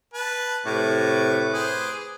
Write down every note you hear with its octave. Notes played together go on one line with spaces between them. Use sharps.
B4 A5
A2 C3 B4 C#6 D6
G#4 C5